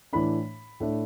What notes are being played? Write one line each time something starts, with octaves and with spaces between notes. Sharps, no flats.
A2 E3 A3 D4 B5
A2 A3 D4